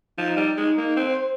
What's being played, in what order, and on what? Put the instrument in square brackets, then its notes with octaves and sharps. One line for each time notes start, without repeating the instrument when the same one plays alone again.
[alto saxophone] F3 [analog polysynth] D#4
[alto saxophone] G3
G#3
A#3
[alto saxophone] C4 [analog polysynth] C5